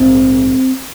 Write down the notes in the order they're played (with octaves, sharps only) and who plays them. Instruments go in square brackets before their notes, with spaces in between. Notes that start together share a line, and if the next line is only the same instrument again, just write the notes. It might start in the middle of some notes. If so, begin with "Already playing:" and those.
Already playing: [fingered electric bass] A#1 G#2 C4